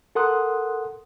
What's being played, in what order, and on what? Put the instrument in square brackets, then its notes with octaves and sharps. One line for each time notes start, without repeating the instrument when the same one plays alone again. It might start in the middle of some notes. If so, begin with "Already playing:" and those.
[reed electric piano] A4 A#4 F#5 C6 D#6 F#6